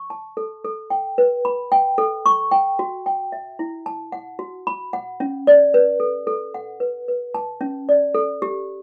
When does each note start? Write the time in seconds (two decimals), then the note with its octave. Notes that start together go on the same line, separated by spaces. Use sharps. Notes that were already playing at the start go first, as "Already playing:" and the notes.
Already playing: C#6
0.10 A5
0.37 A4
0.65 A4
0.90 G5
1.18 B4
1.45 B5
1.72 G5
1.98 A4
2.26 C#6
2.51 G5
2.79 F#4
3.06 G5
3.32 E5
3.59 E4
3.86 A5
4.12 F#5
4.39 F#4
4.67 B5
4.93 F#5
5.20 C#4
5.47 D5
5.74 B4
6.00 A4
6.27 A4
6.54 F#5
6.80 B4
7.08 B4
7.34 A5
7.61 C#4
7.89 D5
8.15 A4
8.42 G4